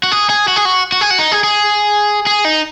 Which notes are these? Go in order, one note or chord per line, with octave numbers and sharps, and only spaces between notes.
F#4
G#4
G#4
F#4
G#4
F#4
F#4
G#4
F#4
D#4
G#4
G#4
G#4
D#4